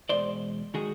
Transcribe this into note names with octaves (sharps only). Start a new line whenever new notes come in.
E2 B2 G#3 C5 D5
D#3 G#3 F#4 G#4